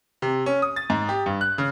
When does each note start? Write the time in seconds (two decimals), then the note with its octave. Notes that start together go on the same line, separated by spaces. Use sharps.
0.22 C3
0.46 C#4
0.62 D#6
0.76 A6
0.90 G#2
1.09 G4
1.26 G2
1.41 F#6
1.58 C#3